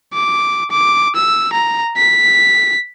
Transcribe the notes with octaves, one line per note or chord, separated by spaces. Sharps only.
D6
D6
E6
A#5
B6